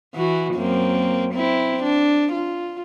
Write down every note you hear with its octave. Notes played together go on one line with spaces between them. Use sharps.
E3 F#4
F#2 A#3 C4
C4 E4
D4
F4